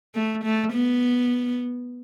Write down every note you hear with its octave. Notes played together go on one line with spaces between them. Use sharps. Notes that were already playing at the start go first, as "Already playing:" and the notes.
A3
A3
B3